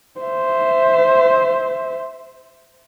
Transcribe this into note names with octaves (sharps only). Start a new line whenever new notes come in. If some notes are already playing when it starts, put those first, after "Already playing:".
C5 E5